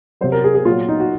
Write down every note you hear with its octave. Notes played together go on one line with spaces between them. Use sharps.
C3 F#3 C5
A#4
G#4
G#4
A#2 F#3 F4
D#4
F#4